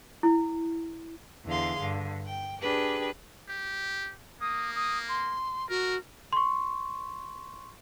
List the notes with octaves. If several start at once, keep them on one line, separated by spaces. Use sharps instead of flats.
E4
E2 D3 G#4 F5 C6
G2 D3
G5
D4 G4 G#4 B4
G4
A#3 D#6
D#6
C6
F#4 A#4
C6 C#6